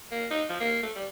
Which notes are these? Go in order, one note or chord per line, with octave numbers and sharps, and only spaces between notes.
A#3
D#4
F3
A#3
A3
G3